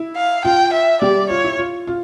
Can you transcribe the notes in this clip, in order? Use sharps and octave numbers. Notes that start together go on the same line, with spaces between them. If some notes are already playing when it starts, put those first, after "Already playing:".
Already playing: E4
F5
F4 G5
E5
G3 G4 D5
F4 C#5
E4
F4
F4